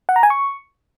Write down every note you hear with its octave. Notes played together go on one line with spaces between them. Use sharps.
F#5
A#5
G#5
C#6